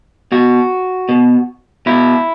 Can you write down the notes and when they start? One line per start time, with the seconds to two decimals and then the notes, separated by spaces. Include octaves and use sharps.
0.32 B2 F#4
1.09 B2
1.86 B2 E4